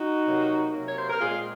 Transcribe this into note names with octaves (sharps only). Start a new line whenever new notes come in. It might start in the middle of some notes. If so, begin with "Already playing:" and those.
Already playing: D#4 F#4
C3 F#3 A#3
C3 F#3 A#3
C#5
C5
A#4
A#2 G#3 C4 F4 G#4